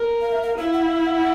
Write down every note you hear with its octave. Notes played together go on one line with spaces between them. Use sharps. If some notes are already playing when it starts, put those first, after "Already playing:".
Already playing: A#4
F5
E5
F5
E4 F5
F#5
F5
F#5